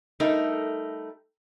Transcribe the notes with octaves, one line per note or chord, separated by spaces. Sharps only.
G3 A3 D#4 A#4